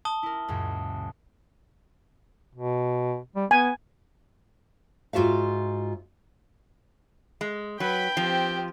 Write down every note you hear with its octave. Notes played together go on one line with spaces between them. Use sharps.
A5 D#6 G7
E4 A#4
C#2 F#2 A#2
B2
G3
B3 G#5
G#2 F4 F#4 E5 F5
G#3
F#3 B4 G5 B5
F3 C4 G4